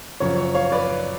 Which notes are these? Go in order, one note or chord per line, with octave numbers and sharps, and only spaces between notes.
F#2 C#3 F3 C#5
C#5
C#5 F5
B4 D5